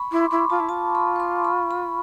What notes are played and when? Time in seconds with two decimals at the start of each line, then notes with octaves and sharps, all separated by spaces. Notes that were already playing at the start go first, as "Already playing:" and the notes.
Already playing: B5 C#6
0.12 E4 C6 D6
0.31 E4 B5 C#6
0.50 F4 A5 B5
0.60 E4
0.69 F4 A5 B5
0.95 B5 C#6
1.16 C#6
1.20 C6 D6
1.44 B5 C#6
1.70 B5 C#6